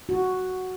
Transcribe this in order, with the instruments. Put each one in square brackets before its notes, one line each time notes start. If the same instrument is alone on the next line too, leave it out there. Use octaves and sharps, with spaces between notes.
[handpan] F#4